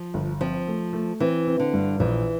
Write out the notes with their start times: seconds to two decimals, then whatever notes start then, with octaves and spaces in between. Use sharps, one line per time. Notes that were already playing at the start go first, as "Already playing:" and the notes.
Already playing: F3
0.14 G1
0.41 F3 C4
0.67 A3
0.93 A3
1.20 E3 C4
1.47 C4
1.60 D3
1.74 G2
2.00 A#1 E3